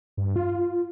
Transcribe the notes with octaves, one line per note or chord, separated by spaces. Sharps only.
G2
F4